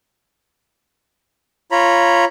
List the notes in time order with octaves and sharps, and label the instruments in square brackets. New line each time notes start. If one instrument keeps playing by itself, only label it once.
[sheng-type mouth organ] F4 C#5 A#5 B5